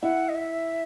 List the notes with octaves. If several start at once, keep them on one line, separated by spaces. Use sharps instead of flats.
E4 F#5
D#5
E5